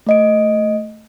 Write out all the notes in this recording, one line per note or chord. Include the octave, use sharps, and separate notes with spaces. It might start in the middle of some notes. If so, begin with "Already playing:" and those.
A3 D#5 D7